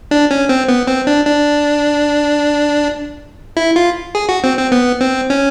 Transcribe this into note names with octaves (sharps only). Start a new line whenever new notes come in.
D4
C#4
C4
B3
C4
D4
D4
E4
F4
G#4
F#4
C4
C4
B3
C4
C#4